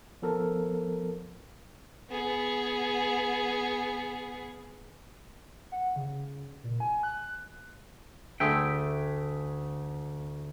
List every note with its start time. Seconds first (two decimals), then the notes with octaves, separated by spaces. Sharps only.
0.22 F3 B3 A4 A#4
2.11 B3 G#4
5.72 F#5
5.96 C#3
6.64 A#2
6.80 G#5
7.03 F#6
8.40 D2 G#4 E5 G5 C6